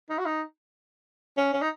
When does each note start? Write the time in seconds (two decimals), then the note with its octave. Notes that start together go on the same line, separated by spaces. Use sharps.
0.10 D#4
0.18 F#4
0.25 D#4
1.37 C#4
1.53 C#4
1.61 D#4